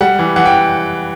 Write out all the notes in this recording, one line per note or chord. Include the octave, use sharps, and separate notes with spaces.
G3 F#5
E3
E3 F#5
G5